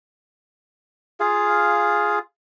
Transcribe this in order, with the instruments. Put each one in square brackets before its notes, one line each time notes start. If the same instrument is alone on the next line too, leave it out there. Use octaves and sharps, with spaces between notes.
[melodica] F4 G#4 F5